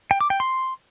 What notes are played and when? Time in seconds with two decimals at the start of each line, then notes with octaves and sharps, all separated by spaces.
0.11 G5
0.21 D6
0.30 G5
0.40 C6